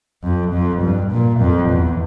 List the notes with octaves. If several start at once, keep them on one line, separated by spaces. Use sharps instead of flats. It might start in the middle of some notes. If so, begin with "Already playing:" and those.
F2
F2
G2
A#2
F2
E2